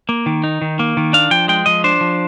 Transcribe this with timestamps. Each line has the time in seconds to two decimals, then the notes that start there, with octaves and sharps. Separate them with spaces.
0.09 A#3
0.26 D#3
0.44 D#4
0.62 D#3
0.79 A#3
0.97 D#3
1.13 D4 F5
1.31 F3 G5
1.48 G#3 G5
1.66 F3 D#5
1.84 D4 C5
2.01 F3